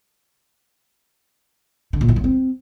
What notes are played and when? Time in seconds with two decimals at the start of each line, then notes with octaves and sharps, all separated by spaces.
1.93 D3
2.01 A#2
2.09 E3
2.16 F#3
2.24 C4